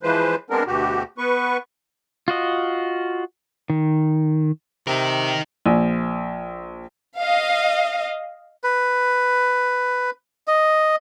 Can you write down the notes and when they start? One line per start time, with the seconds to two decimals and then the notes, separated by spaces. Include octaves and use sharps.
0.03 E3 F3 G#3 B4 C5
0.50 G#3 B3 C4 D4 A#4
0.67 D2 B2 F#4 G4
1.18 B3 B4 C#6
2.28 F4 F#4 D#5
3.70 D#3
4.87 C3 D#4 A#4
5.66 A#1
7.17 D#5 F5
8.64 B4
10.48 D#5